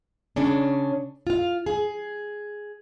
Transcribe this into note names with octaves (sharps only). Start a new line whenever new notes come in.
C#3 C#4 D4
F4 F5
G#4